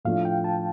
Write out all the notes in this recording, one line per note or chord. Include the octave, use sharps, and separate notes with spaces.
A2 F3 A3 D4 F4 F5
G5
A5